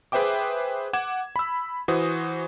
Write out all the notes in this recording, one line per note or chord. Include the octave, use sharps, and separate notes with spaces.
G#4 B4 C5 E5 G5 D6
F#5 D6 G#6 E7
B5 E6
E3 F#4 C5 D#6